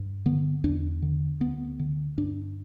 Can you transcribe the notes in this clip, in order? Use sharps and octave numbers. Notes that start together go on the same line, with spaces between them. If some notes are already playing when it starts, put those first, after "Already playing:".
Already playing: G2
D3 B3
E2 D4
D3
D2 B3
D3
G2 D4